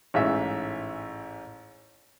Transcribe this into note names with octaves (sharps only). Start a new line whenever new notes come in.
A1 G#2 E5